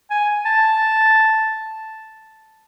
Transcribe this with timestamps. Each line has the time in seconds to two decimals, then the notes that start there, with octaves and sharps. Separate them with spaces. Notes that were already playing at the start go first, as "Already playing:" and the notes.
0.10 G#5
0.45 A5